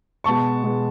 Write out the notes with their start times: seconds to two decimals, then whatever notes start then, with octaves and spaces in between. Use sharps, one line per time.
0.24 B2 G#3 B3 A5 C#6
0.63 B2 G#3 B3